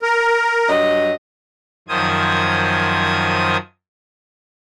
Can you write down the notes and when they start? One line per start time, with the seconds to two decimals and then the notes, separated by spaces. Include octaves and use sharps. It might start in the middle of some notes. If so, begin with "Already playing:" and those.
0.02 A#4
0.68 G2 F#3 D#5
1.88 F#2 D#3 F3 C5 D#6 G#6